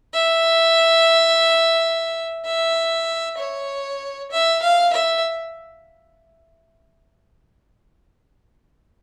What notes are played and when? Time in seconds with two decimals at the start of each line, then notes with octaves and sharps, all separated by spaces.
0.14 E5
2.45 E5
3.38 C#5
4.31 E5
4.62 F5
4.93 E5